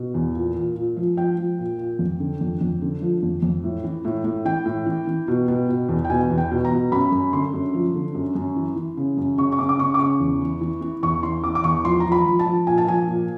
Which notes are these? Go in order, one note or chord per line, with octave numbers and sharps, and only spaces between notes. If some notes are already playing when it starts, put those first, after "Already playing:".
Already playing: B2
E2
A#2
A#2
A#2
F3
F3 G5
F3
A#2
A#2
F2
D3
F2
F2
D3
F3
F2
F2
A2
E3
A2
A2
E3 G5
A2
E3
E3
B2
B2
B2
E2
G5
B2 G#5
E2
G5
B2
A#5
B2
F#2 B5
F#2
D3 C6
F#2
F3
D3
F#2
F#2
E3
E3
C#3
F#2
C#3 C#6
C#6
C#3 D6
D6
C#3 C#6
D6
C#3 C#6
E2
E3
E3
E3
E2 C#6
E3 C6
E3 D6
D6
E2 C#6
F3 C6
A#5
F3
B5
F3
A5
F3
A#2 G#5
A5
F3 G#5
A#2